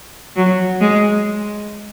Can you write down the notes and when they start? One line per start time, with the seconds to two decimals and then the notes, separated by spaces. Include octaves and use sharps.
0.36 F#3
0.81 G#3